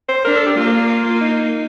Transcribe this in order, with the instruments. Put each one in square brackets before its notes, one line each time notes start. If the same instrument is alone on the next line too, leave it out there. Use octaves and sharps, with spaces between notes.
[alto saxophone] C5
[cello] D4 [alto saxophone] A#4
[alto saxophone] A4
G4
[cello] A#3 [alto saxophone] F4
[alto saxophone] F4
D#4